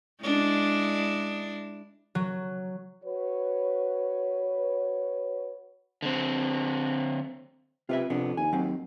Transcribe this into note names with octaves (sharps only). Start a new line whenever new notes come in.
G#3 D4 E4
F#3
F#4 B4 C#5
D3 C4
C3 F4 B4 E5
F2 C3 B3 D4
D#2 G#5
F#3 C4